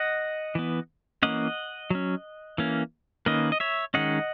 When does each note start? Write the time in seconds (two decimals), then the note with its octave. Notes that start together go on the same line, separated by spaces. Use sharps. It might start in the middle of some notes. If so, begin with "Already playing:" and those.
Already playing: D#5 F#5
0.55 E3 B3
1.23 E3 A#3 C#4 D#5 F#5
1.90 F#3 C#4
2.58 E3 A#3 C#4
3.26 D#3 A#3 C#4 B4 D#5
3.52 D#5
3.60 C#5 E5
3.94 D#3 G#3 C#4 D#5 F#5